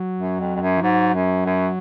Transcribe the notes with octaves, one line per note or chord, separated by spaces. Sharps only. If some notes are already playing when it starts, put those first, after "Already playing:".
Already playing: F#3
F#2
F2
F2
F#2
F3
G#2 F#3
F#2
F#2